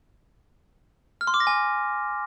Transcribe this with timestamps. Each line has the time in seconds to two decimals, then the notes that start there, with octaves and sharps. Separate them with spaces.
1.21 F6
1.27 C6
1.34 D6
1.40 A#6
1.47 G#5